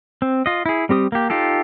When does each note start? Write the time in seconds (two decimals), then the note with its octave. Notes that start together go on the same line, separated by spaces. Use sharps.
0.22 C4
0.46 F4 D#5
0.66 E4 G#4
0.89 G3 C4 G4 D#6
1.12 A#3 G4
1.30 D#4 F4 G4 A4